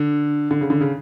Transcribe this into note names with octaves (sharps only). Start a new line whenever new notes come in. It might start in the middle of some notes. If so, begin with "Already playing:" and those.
Already playing: D3
D3
C#3
D3
C#3